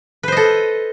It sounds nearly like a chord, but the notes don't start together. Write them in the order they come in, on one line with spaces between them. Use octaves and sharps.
B4 C5 D#5 A4